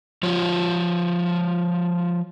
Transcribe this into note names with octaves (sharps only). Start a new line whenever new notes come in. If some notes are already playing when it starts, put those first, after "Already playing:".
F3 F4 C#5